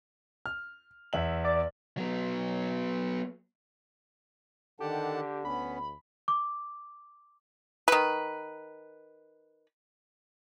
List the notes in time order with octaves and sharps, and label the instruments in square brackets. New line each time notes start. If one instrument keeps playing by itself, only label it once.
[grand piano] F6
E2 E5 F#7
[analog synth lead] D5
[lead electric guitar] F#3 B3
[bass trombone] D3 [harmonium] D#3 F#5 A5 [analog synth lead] G4 [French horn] A4
[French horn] D2 [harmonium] B3 C#4 [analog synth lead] B5
[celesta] D6
[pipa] D#3 B4